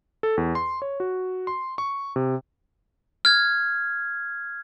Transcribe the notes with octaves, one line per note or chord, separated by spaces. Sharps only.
A4
E2
C6
C#5
F#4
C6
C#6
C3
F6 G#6